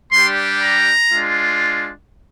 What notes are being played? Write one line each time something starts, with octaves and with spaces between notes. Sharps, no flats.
G3 D4 G4 C6
A#5
G#3 D4 F4